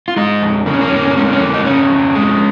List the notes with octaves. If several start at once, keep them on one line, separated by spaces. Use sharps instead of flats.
F4
G#3 D#4
F2
C#3 A#3
C#4
A#3
C#4
F2
A#3
C#4
A#3
G#3 C#4
A#3
C#4
F2 A#3
D#4
C#3 C#4
F2
G#3